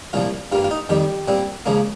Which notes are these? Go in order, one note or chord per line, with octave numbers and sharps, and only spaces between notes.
C2 A#2 F3 F4
G2 G3 A#3 F4
F4
D#4
F2 D#3 G3 G4
A#2 G3 C4
C#2 C#3 F3 A#3